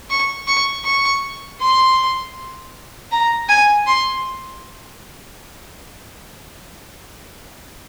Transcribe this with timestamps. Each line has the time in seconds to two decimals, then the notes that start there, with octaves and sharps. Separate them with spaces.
0.10 C#6
0.47 C#6
0.85 C#6
1.61 C6
3.11 A#5
3.48 G#5
3.87 C6